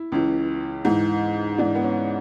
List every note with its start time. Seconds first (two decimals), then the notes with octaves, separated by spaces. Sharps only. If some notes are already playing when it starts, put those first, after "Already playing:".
Already playing: E4
0.12 C#2 C#3 E3
0.85 G#2 E3
1.58 G#2 E3 D4
1.75 B3
1.83 C#4